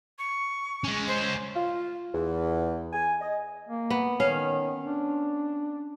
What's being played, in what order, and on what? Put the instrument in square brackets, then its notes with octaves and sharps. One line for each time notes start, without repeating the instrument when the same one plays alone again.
[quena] C#6
[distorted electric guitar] G#3 C#4
[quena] C5
[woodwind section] F4
E2
G#5
D#5
[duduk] A#3
[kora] B3
[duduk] D#3 [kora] C#4 F5
[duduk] D4